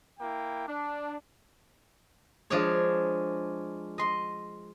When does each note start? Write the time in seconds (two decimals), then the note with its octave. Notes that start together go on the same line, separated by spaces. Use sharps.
0.19 A#3 E4 G5
0.68 D4
2.50 F3 G#3 D4 G#4 C#5
3.98 D#5 C6